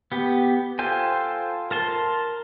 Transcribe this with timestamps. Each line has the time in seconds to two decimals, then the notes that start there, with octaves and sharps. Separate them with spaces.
0.12 B3 G4
0.79 F4 A4 C5 G5 G#5
1.71 A#4 A5 C6